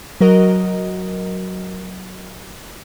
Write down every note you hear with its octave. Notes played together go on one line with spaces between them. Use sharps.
F#3 F#4 A#4 D#5